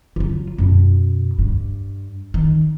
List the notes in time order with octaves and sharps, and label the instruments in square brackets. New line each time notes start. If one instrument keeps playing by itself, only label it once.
[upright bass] F#3 F4
F#2 B2
G2
D#3